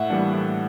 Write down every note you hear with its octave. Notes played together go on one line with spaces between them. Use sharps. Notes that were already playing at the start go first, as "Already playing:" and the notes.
Already playing: A2 E5 F#5
E3 G3 A#3 D4
A2